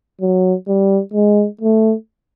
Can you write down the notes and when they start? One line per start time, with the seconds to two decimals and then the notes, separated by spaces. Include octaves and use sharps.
0.21 F#3
0.68 G3
1.14 G#3
1.61 A3